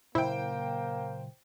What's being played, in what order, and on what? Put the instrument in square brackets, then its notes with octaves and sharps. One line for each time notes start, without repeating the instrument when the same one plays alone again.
[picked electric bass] A#2 C#3 F#3 [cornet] A#3 [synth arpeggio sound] E4 [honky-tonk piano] C5 G5